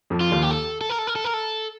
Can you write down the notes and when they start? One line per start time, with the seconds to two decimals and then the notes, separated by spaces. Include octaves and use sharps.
0.10 F2 F3
0.21 F4
0.31 D#2 D#3
0.42 G4
0.51 A4
0.81 A4
0.89 A#4
0.99 A4
1.07 A#4
1.16 A4
1.24 A#4
1.34 A4